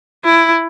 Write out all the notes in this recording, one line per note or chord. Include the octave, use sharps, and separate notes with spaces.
E4